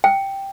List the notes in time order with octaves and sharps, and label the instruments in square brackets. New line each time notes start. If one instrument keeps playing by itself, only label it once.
[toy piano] G5